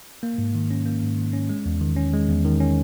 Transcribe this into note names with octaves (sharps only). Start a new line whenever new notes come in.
A#3
G#2
D#3
C#4
A#3
G#2
D#3
C#4
G#3
E2
D#3
C#4
G#3
E2
D#3
C#4